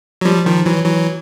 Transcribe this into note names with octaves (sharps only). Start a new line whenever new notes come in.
F#3
F3 G3
D#3 F3
E3 F#3
E3 F#3